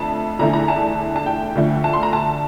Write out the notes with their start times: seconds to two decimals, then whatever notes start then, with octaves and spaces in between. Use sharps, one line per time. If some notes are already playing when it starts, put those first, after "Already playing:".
Already playing: F2 D3 A3 A5
0.39 E2 D3 A3 A#5
0.53 A#5
0.68 A5
1.16 A5
1.26 G5
1.55 D2 D3 F3 A3
1.84 A5
1.93 C6
2.03 A#5
2.13 A5